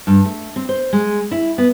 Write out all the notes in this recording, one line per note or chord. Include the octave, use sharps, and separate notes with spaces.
G2
A3
C4
C5
G#3
E4
B3